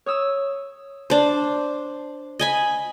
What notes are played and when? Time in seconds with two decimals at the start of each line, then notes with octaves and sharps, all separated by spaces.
0.06 C#5 D#6 E6
1.10 D4 C5
2.39 D#5 G#5 B5